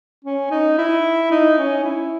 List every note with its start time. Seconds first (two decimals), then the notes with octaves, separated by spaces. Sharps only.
0.24 C#4
0.51 D#4
0.78 E4
1.31 D#4
1.57 C#4
1.84 E4